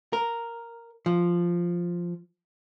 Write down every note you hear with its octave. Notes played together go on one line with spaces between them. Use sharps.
A#4
F3